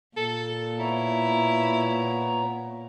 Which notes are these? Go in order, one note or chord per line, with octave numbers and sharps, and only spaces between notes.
A#2 A4
B3 E4 C#5 A#5